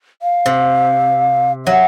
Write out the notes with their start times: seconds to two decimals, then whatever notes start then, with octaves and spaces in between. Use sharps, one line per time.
0.22 F5
0.46 C3
1.66 F#3 E5